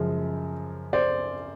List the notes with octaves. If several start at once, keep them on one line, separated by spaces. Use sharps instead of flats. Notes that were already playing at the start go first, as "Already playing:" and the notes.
Already playing: F#2 C#3 F3 G#3
C5 D5